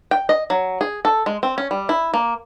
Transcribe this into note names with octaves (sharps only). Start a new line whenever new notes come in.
G5
D#5
F#3
G#4
A4
G#3
C4
C#4
G3
E4
A#3